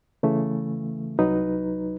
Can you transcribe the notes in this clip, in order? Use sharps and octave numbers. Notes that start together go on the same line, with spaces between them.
C#3 E3 A3
C2 F#3 D#4 B4